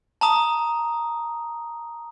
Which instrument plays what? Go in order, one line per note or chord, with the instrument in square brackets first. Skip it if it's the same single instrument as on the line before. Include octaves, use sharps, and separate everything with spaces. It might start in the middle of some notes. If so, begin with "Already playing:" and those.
[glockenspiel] A5 A#5 D#6